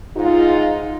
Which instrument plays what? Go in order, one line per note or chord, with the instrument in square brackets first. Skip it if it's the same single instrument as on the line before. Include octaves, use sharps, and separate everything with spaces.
[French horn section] G#2 D#4 F4